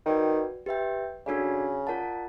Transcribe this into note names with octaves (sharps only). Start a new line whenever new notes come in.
D#3 F#4 B4 D5 G5
G4 B4 E5 G5
C#3 D4 F#4 A4 D5
F4 A#4 D5 F#5 A5